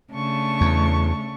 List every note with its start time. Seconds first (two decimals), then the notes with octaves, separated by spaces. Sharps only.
0.12 C#3 A3 D4 C#6
0.61 E2